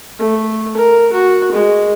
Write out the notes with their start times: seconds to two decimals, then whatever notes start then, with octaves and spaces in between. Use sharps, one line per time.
0.19 A3
0.77 A#4
1.13 F#4
1.52 G#3